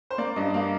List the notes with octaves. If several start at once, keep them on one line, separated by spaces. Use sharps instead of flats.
C5
A#3 D5
G2 D#5
A#3 F5